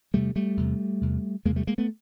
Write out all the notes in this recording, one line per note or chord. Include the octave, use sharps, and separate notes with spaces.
E2 C3 G3 A3
G3 A3
E2 C3
E2 C3
E2 C3 G#3 A#3
G3 A3
G#3 A#3
A3 B3